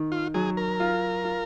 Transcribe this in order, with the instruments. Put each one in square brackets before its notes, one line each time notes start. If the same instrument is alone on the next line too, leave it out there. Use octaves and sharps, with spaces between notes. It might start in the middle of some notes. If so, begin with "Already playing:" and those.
Already playing: [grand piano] D#3
[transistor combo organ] F4
[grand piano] F#3 [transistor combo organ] G#4
[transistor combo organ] A#4
[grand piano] F4
F4